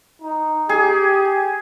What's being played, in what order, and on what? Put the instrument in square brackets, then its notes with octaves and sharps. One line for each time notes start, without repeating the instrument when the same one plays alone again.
[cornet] D#4
[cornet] G4 [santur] G#4